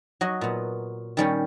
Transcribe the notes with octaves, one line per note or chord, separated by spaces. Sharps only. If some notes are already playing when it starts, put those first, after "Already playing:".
F#3 F#4 D#5
A#2 B3
D#3 G3 C#4